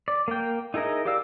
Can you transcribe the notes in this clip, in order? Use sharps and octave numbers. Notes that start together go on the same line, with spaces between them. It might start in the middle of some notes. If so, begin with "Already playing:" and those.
D5
A#3 G5
D#4 E4 G#4 A#4 D#5
G4 A#4 D5 F5 E6